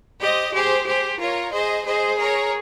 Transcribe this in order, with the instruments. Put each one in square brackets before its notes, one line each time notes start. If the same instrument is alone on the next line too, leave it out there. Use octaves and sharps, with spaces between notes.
[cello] G4 [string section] C5 D#5
[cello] G4 [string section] G#4 C5
[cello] G4 [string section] G#4 C5
[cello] F4 [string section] A#4 C#5
[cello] G#4 [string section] C5 D#5
[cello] G#4 [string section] C5 D#5
[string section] A#4 C#5